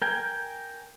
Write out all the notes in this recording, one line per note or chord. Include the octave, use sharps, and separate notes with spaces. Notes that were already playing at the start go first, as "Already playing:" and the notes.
A#4 G5 G#5